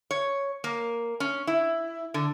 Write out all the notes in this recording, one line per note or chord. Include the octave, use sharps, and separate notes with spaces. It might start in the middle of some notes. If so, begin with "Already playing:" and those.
C#5
A#3
C#4
E4
D3